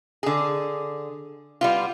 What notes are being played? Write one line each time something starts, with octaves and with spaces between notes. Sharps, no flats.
D3 G#4
G3 B3 F4